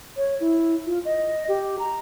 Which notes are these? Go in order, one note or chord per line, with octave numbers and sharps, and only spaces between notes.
C#5
E4
F4
D#5
G4
A#5